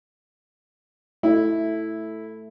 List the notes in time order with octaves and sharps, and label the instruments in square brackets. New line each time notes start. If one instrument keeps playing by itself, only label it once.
[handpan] A3 [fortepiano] E4